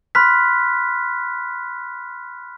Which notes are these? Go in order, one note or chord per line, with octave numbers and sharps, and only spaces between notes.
B5 C6 F6 F#6 B6